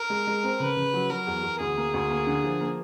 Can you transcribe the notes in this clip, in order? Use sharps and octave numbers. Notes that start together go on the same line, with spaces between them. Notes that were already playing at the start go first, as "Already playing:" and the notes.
Already playing: A#4
G#3
G#3
C4
C#3 B4
C#3
F#3
F#3 A#4
E2
E2
D2 G#4
A#3
D2
A#3
D3
F3
A#3